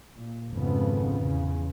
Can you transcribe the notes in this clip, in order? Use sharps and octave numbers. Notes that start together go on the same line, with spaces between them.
A#2
G#1 F2 C#3 B3
E2 C#3